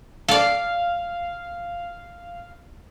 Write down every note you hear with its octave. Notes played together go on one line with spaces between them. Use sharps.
A4 D5 F5